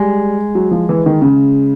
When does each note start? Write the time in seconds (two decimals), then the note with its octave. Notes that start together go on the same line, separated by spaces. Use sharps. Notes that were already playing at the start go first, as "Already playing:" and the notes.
Already playing: G3 G#3
0.55 F#3
0.71 F3
0.89 E3
1.06 D#3
1.22 C#3